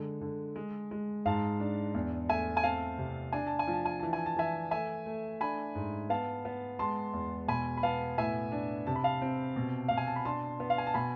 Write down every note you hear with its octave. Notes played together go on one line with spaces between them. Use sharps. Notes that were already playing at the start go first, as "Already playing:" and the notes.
Already playing: D3 G#3
D3
G#3
G#3
G#2 F5 A5
D4
E2
A3 E5 G#5
G#5
C4 F5 A5
C3
D4 G#5
A5
G#5
F3
A5
G#5
E3 A5
G#5
A5
E3 E5 G#5
A3 E5 G#5
A3
D4 G#5 B5
G#2
B3 F5 A5
B3
G#3 A5 C6
E2
B2 G#5 B5
B5
B3 F5 A5
A2 E5 G#5
D4
C3 A5
B5
F5 A5
C4
B2
B2 F5
G#5
A5
B5
D4 A5 C6
B3
F5
G#5
A5
B2 G#5 B5